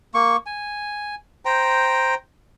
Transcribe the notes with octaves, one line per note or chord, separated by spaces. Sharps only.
A#3 C#6
G#5
C5 G5 A#5